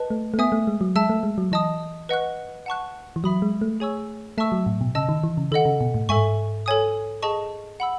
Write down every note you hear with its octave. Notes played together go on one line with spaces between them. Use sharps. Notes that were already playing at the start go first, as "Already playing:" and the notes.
Already playing: B4 D#5 A5
A3
A3
B3 E5 G#5 D#6
A3
G#3
F#3
G#3 E5 A5 E6
A3
G#3
F#3
E3 D#5 A5 D#6
B4 D#5 F#5 C#6 F#6
F#5 A5 C#6 F#6
E3
F#3 E5 B5 D#6
G#3
A3
G#4 C#5 G#5 C#6 E6
A3 E5 A5 C#6 E6
F#3
A2
B2
C#3 D#5 A5 E6
D#3
E3
C#3
D#3 A4 D#5 F#5
C#3
B2
A2
G#2 A4 E5 G#5 C#6
A4 C#5 G#5 D#6
G#4 D#5 A5 C#6
F#5 B5 E6